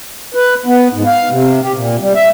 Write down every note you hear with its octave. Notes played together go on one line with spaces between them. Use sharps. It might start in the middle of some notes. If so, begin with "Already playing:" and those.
B4
B3
G#2
F5
C3
G4
A#2
G3
E5